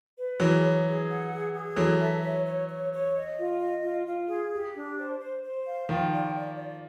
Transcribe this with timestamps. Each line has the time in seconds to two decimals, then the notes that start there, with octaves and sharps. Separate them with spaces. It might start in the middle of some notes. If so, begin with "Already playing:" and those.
0.17 B4
0.39 E3 F#3 G#4
0.63 C#5
0.86 G#4
1.08 F#5
1.31 G#4
1.54 G#4
1.76 E3 F#3 A4
2.00 E5
2.23 C#5
2.46 C#5
2.68 C#5
2.92 C#5
3.15 D#5
3.37 F4
3.60 D#5
3.83 F4
4.06 F4
4.29 G#4
4.52 G4
4.75 D4
4.98 C5
5.21 C5
5.43 C5
5.66 F5
5.89 D#3 F3 G5
6.12 D5
6.36 D5
6.57 D5